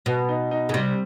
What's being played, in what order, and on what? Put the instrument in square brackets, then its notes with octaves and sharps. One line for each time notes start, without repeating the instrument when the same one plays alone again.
[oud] B2 [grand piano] B3
[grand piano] D#4
D#4
[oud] C#3
[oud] C3 [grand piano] G3